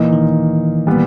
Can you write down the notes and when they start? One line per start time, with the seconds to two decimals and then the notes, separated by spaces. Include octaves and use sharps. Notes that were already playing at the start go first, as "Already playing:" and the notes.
Already playing: A#2 E3 A#3 D#4
0.13 D#3
0.87 A#2 G3 B3